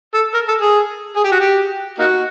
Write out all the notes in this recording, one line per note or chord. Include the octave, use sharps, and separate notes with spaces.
A4
A#4
A4
G#4
G#4
G4
F#4
G4
A#3 D#4 F#4